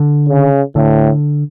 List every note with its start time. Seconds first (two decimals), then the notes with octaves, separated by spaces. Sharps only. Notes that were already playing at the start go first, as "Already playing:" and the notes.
Already playing: D3
0.28 C#3
0.76 A2 D3